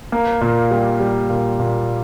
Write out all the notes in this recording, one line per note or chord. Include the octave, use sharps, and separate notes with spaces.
A#3
A#2
G3
G3
A#2
A#2